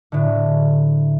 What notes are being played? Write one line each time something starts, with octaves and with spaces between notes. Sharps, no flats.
A2 D3